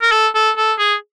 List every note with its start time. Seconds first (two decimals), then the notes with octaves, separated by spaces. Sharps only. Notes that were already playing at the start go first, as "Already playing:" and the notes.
0.02 A#4
0.12 A4
0.35 A4
0.57 A4
0.79 G#4